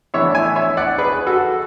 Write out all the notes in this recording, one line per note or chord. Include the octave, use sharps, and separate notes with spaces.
A2 E3 B3 D4 C#5 E5
E5 G#5
C#5 E5
D5 F#5
G#4 B4
B4
F#4 A4